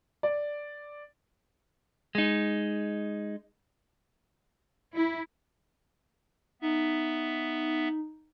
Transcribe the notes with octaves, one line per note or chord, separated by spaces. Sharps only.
D5
G#3 D#4
E4
B3 D#4 E5